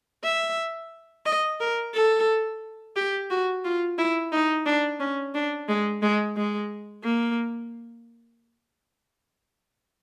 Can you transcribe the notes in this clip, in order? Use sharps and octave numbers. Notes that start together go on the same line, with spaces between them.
E5
D#5
A#4
A4
G4
F#4
F4
E4
D#4
D4
C#4
D4
G#3
G#3
G#3
A#3